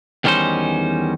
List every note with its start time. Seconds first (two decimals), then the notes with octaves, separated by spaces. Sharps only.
0.24 E2 D#3 G3 C#4 D#4 C5